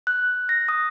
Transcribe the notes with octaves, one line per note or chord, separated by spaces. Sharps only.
F#6
A#6
D#6